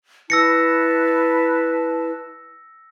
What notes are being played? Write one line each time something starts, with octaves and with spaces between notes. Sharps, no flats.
E4 B4 A5 E6 A#6 C#7